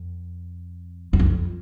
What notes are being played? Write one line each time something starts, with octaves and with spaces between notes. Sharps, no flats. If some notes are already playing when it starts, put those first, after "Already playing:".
Already playing: F2
F#2
F2